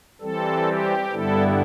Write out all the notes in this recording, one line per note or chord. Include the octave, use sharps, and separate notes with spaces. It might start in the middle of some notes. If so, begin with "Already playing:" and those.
E3 G3 C4 A4
G4
G2 D3 G3 B3 E4 A4